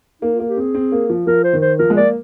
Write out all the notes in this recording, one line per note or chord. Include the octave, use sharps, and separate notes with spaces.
A#3 D#4
F4
A#3
G4
C4 G#4
C4
A#3
F3
F3 A#4
C5
D#3
C5
F3 A#4
G#3
A#3 D5